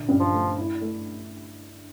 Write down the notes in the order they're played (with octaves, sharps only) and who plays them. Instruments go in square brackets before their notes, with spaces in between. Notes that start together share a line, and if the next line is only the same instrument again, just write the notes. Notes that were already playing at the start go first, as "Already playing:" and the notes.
Already playing: [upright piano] A#1 D3
G2
[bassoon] F3
[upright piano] A3
E4
A3